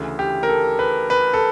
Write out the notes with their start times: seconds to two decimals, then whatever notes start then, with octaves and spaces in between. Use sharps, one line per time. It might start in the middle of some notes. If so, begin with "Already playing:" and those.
Already playing: D2 C#3 E3
0.19 G4
0.43 A#4
0.49 A4
0.79 B4
1.10 B4
1.34 A4